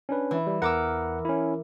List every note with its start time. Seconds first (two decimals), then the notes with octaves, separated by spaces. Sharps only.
0.09 C#4 D4 B4
0.31 E3
0.47 G3
0.62 E2 A#4 F#5 D6 E6
1.25 C#4 E4